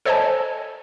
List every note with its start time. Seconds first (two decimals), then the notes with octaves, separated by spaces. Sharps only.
0.05 A4 C5 C#5 D#5 G#5 A5